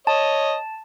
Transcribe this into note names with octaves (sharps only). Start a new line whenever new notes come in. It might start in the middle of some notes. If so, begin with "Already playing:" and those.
C#5 D#5 A5